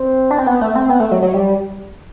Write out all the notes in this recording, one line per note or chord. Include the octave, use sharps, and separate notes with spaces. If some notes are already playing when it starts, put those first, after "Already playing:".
Already playing: C4
D4
C4
B3
A3
C4
B3
A3
F#3
F#3
G3